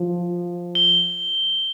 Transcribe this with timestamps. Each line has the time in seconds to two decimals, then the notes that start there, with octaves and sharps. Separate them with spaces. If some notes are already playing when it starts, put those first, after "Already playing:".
Already playing: F3
0.75 G7